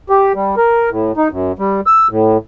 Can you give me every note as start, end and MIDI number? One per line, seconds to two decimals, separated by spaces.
0.09 0.33 67
0.35 0.55 55
0.57 0.90 70
0.90 1.12 45
1.17 1.28 63
1.31 1.52 42
1.59 1.81 55
1.86 2.08 88
2.10 2.38 45